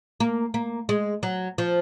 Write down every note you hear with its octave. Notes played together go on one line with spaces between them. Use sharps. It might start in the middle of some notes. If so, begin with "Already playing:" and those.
A#3
A#3
G#3
F#3
F3